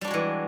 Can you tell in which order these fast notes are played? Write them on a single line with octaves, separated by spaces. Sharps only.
G3 D4 F#4 G#3 E3